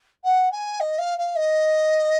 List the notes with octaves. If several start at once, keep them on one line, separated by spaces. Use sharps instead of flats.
F#5
G#5
D#5
F5
F5
D#5